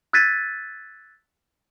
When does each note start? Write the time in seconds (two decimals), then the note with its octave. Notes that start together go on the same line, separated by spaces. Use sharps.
0.13 E6 F#6 G#6 A6 B6 D#7